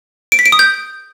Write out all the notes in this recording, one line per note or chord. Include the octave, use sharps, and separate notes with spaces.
D7
B6
D7
D#6
G6